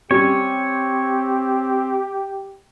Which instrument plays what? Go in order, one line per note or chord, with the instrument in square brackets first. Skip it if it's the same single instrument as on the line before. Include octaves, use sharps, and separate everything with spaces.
[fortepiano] G3 C#4 [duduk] C4 [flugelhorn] G4 [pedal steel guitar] C#5